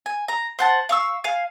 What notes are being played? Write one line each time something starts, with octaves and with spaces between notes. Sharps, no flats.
G#5
A#5
C5 F#5 A5
F5 C#6 E6
F5 G#5